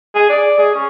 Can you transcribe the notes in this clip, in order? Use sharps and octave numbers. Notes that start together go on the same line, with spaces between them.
G#4
D5
G#4
C#4